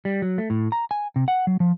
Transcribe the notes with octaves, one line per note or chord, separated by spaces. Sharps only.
G3
F#3
A3
A2
A#5
G#5
C3
F#5
F#3
F3